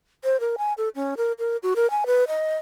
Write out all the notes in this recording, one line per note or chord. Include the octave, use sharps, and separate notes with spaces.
C5
A#4
G#5
A4
C#4
A#4
A#4
F#4
A#4
G#5
B4
D#5